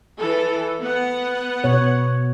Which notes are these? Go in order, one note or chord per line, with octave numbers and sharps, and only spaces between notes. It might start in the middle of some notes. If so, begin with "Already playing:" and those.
E3 A4
B3 F#5
B2 C#5